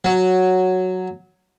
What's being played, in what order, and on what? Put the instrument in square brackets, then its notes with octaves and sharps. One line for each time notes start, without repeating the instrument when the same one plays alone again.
[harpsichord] F#3